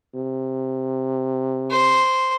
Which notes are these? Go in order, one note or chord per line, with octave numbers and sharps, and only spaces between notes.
C3
C5